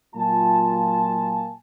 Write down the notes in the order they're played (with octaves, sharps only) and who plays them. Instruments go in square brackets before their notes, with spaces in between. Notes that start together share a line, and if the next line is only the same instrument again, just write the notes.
[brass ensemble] A#2 F#3 A#3 F4 G#5 A5